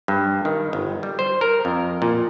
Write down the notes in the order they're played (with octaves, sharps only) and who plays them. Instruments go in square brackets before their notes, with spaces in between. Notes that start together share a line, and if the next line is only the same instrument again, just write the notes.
[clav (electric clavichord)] G2
D#3
G1
G3
C5
A#4
F2
A#2